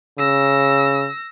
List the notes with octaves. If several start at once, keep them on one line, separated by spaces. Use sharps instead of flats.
C#3 E6 A#6